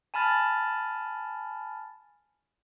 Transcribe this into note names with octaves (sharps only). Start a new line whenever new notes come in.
G#5 A5 B5 F6 A6